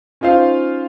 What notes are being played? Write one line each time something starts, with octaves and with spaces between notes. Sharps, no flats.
C#4 D#4 F4 C5 F5